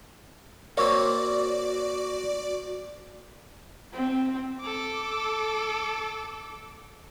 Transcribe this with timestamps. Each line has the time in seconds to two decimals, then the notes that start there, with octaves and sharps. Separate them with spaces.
0.77 A#3 C4 F#4 C#5 D5
3.93 C4
4.60 A4 D6